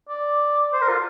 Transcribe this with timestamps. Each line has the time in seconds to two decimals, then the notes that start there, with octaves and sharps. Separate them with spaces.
0.09 D5
0.73 C5
0.82 A#4
0.89 F4